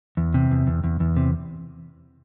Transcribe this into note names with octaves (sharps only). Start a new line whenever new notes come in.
E2
C3
E2
E2
E2
E2
C3